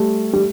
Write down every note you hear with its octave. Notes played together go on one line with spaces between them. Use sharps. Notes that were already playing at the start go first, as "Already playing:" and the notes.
Already playing: G3 A3
G3